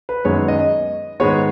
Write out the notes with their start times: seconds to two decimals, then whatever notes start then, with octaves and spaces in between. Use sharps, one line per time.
0.09 B4
0.25 F#2 D#3 G#3 B3 C#5
0.48 D#5
1.20 G#2 D#3 G#3 B3 C#5